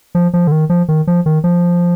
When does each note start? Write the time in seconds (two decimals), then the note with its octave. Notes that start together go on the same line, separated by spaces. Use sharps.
0.15 F3
0.33 F3
0.47 D3
0.52 D#3
0.69 F3
0.88 D#3
1.07 F3
1.26 D#3
1.44 F3